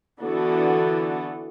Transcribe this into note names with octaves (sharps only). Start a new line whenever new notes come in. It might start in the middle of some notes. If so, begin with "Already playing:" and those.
D3 E3 B3 D4 F#4 A4